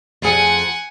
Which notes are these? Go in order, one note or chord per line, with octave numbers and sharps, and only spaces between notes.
F2 G#4 F#5 G#5